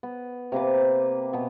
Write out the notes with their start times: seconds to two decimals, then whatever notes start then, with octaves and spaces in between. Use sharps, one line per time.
0.03 B3
0.52 C3 A#3 B4 D6
1.33 B2 B3